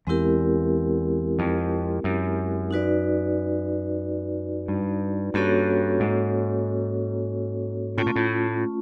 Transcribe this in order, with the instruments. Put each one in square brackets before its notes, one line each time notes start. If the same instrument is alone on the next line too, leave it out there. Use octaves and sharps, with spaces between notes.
[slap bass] E2 [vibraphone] G#3 C4 E4 G4 A#4
[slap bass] F2
F#2
[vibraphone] D#4 F#4 B4 D5
[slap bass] G2
[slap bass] G2 [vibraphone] A#3 C#4 F#4 A4 C#5
[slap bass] G#2
[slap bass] A2 [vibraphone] A3 C#4 F4
[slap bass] A#2
A2